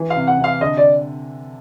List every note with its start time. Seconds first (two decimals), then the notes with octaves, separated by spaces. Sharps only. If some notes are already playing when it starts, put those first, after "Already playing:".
Already playing: E3
0.10 F5
0.16 C3
0.27 F#5
0.38 C3
0.44 F5
0.61 D3 D#5
0.77 D5